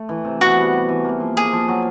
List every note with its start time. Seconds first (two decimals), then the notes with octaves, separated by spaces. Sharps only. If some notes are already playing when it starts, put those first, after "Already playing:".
Already playing: A3
0.09 E3
0.25 C3
0.41 B3 F#4
0.57 G3
0.72 G3
0.89 E3
1.04 A#3
1.20 F3
1.36 A#3 G#4
1.53 F3
1.68 F#3